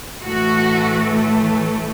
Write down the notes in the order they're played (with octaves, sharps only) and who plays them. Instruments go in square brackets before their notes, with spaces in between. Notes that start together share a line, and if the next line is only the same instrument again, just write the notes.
[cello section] A2 E3 A3 F#4